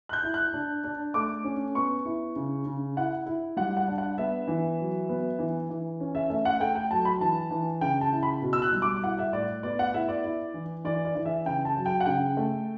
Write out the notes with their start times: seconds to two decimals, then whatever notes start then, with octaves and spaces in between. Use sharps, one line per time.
0.09 F#6
0.13 G6
0.23 E4
0.34 F#6
0.54 D4
0.84 D4
1.14 A3 D6
1.44 C#4
1.75 B3 C#6
2.05 E4
2.36 C#3
2.66 C#3
2.97 E4 F#5
3.26 E4
3.57 G3 F#5
3.77 F#5
3.88 D4
3.98 F#5
4.18 B3 E5
4.47 E3
4.79 F#3
5.09 B3
5.39 E3
5.70 E3
6.00 C#4
6.15 E5
6.30 A3 E5
6.45 F#5
6.60 A3 G5
6.75 G5
6.90 F#3 A5
7.05 B5
7.20 E3 A5
7.51 E3
7.81 C#3 G5
8.01 A5
8.12 E4
8.23 B5
8.42 B2
8.53 E6
8.62 F#6
8.72 G3
8.82 D6
9.02 E4 F#5
9.19 E5
9.33 A2 D5
9.63 B3 D5
9.79 F#5
9.94 E4 E5
10.09 D5
10.24 E4
10.54 E3
10.84 E3 D5
11.05 D5
11.15 E3
11.25 E5
11.45 C#3 G5
11.65 A5
11.76 F#3
11.86 G5
12.00 F#5
12.06 C#3 G5
12.37 A3